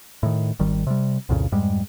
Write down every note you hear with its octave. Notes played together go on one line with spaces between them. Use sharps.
A2 D#3
G#1 D#3 G3
C3 G3
C2 F2 A#2 C#3
F2 G#2 G3 G#3